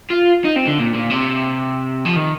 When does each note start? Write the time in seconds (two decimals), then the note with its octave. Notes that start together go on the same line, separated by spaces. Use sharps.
0.10 F4
0.44 D#4
0.56 C4
0.67 D3
0.79 A#2
0.94 A#2
1.10 C3
2.06 F3
2.16 D#3